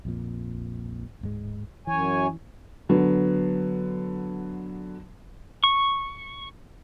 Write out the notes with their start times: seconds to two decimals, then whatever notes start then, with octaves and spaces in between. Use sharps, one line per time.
0.05 A#1 F2 A#2
1.21 D1 G#2 G#3
1.87 F#2 E3 C#5 G#5
2.89 D3 F#3 B3
5.64 C#6